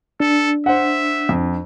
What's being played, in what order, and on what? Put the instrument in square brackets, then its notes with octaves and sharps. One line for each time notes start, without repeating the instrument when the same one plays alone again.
[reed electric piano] D4 [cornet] A4
[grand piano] C5 F#5 [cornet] E5
[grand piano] F2